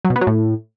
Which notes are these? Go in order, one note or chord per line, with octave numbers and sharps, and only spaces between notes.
F#3
B2
B3
F#3
A2